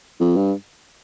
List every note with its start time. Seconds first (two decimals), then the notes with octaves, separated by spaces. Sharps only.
0.20 F2
0.36 G2